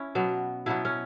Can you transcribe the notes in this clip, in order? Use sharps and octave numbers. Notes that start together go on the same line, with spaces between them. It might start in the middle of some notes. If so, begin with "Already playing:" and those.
Already playing: C#4 E4
B2 F#3 B3
B2 F#3 B3 E4
C#4